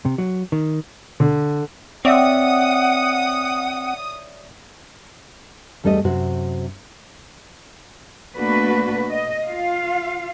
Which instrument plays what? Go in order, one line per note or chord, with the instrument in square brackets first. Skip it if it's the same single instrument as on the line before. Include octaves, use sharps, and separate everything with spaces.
[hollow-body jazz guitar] C3
F#3
D#3
[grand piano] D3
[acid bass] C4 [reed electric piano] C#5 D5 E5 [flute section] F#5 [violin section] D#6
[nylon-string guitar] E2 G3 A3 A4 C#5 D#5
F#2 C3 F#4 C5
[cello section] B2 A3 A#3 D4 F#4 B4
D#5
F4 F5